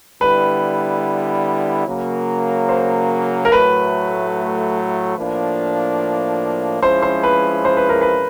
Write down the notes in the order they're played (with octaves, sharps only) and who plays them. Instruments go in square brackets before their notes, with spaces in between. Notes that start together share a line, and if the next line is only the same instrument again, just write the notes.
[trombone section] D3 G3 B3 E4 [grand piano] B4
[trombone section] C#3 F#3 A#3
[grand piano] C5
A#4
[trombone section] A2 F#3 A3 [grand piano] B4
[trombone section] A2 F3 A#3 D4
[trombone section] F3 G#3 C#4 E4 [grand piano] C5
[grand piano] C5
B4
C5
B4
A#4
B4